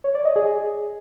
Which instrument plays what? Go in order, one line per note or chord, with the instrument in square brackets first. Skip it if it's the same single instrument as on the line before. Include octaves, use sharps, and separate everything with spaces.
[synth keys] C#5
D5
D#5
G#4